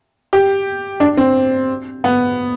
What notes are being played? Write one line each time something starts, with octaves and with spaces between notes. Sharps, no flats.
G4
D4
C4
B3